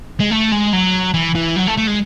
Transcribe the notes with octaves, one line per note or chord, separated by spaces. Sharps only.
G#3
A3
G#3
F#3
E3
E3
F#3
A3
A3
G#3